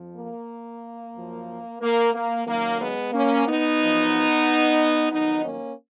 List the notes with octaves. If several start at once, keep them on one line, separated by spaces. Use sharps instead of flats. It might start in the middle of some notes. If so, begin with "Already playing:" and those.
Already playing: F2 F3
A#3
F#2 F3
A#3
A#3
F#2 D#3 F#3 A#3
G#3 B3
A#3 C#4
B3 D#4
F#2 F3
F2 D#3 F#3 B3 D#4
A#3 C#4